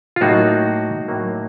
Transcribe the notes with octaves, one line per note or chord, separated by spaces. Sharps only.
F4
A2 F#3 A#3 D#4 F#4
A2 F#3 A#3